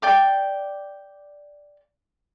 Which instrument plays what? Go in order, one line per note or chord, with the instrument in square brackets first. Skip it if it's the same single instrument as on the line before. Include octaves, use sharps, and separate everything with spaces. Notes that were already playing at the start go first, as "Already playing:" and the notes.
[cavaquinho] D5 G5 D6